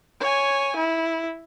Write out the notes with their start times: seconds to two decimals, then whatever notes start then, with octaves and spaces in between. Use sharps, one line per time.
0.20 C#5 G#5
0.76 E4